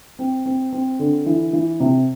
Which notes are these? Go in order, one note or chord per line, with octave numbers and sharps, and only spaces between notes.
C4
C4
C4
D3
E3
E3
C3